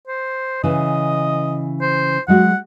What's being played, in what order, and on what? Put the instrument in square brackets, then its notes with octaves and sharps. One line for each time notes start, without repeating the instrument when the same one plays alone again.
[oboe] C5
[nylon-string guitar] C#3 E3 [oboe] D#5
[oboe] C5
[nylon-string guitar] F#3 G#3 F#4 [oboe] F#5